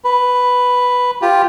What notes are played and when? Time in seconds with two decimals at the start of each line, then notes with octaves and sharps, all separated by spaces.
0.04 B4
1.22 F4 G4